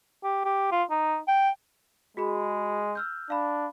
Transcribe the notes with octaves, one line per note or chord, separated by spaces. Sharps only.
G4
G4
F4
D#4
G5
G#3 F#4 G#4 B5
E6 F6 G6
D4 F5 B5